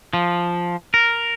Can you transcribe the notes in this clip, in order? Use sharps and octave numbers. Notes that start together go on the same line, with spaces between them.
F3
A#4